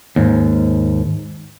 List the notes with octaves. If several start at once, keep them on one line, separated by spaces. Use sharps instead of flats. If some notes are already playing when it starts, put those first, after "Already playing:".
D#2 G#2